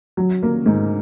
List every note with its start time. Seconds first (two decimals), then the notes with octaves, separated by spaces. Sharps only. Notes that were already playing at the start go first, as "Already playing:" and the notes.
0.17 F#3
0.43 A#3
0.66 G#2